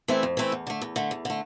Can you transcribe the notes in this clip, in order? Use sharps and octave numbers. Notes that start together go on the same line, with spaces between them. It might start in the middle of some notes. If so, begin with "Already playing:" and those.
E3 A3 C4 E4
F2
E3 A3 C4 E4
E2
D3 A3
E2
D3 A3
E2
D3 A3